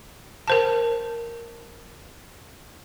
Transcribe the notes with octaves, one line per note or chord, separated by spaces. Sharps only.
A#4 C5 A5